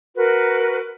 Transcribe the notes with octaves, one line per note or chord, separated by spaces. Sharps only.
F#4 A#4 B4